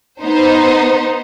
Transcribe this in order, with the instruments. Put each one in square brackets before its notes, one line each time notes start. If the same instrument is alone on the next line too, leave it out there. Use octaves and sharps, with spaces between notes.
[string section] B3 D#4 C5